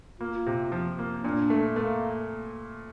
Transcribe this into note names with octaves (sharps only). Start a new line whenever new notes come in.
A#3 F4
C3
F3
A#3
A#2 D4
A3
A3 A#3